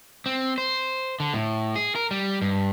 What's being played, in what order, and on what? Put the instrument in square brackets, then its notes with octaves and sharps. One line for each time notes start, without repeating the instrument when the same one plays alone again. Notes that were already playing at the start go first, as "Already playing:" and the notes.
[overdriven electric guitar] C4
C5
D3
A2
G#4
A#4
G3
G2